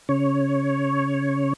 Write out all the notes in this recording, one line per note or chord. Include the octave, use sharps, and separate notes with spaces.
C#3 C#5